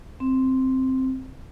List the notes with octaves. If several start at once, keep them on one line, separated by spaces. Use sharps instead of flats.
C4